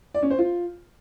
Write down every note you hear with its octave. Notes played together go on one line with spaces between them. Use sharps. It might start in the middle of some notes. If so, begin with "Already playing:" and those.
D5
C#4
C5
F4